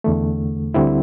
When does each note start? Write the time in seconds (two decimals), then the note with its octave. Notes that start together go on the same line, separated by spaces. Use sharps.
0.04 E2 D3 A3
0.74 D2 D3 G3 C4 E4